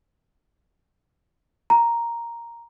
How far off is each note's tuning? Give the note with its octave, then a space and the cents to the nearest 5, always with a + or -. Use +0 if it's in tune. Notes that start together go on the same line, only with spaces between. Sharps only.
A#5 +0